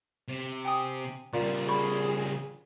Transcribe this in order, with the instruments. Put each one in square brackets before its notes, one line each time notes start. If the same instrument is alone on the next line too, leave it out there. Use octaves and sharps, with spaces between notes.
[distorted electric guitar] C3
[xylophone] G5 G#5 D#6
[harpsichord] A#2 [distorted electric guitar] C#3 G3
[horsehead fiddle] G#4 [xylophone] B5 C#6